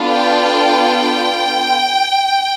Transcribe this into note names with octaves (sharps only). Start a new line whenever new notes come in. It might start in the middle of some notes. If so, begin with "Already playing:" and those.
Already playing: B3 D4 F4 A4
G5